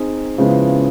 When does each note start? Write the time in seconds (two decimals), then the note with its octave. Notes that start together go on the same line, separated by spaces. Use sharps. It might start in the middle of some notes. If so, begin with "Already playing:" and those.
Already playing: C4 D#4 G#4
0.38 C#3 F3 G#3 B3 E4